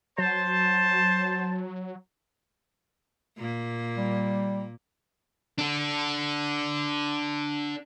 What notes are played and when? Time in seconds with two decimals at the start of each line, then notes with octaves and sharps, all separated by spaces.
0.18 F#3 C5 A5
3.37 A#2 A#3
3.97 G3
5.59 D4 A4